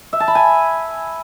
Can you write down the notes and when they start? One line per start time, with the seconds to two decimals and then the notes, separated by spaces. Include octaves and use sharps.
0.13 E5
0.20 A5
0.28 B5
0.35 G#5